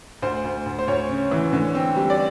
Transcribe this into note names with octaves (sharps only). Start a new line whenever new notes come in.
D2 C5
D2
D2
C5
D2 C#5
C#3
E3
D3
C4
G3
D5